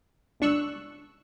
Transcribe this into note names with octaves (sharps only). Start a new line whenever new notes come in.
G1 C#2 D4 C#6 E6 F#6